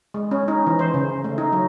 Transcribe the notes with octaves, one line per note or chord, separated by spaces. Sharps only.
G#3
C#4
D#4
E3
C5
C#3
A3
D#4
F#3